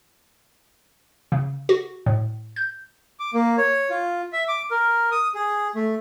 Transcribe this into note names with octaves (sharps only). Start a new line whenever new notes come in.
C#3
F#4
A2
G6
D6
A#3
C#5
F4
E5
D6
A#4
D#6
G#4
A3